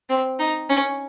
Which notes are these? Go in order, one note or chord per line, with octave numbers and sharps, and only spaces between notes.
C4
D#4
C#4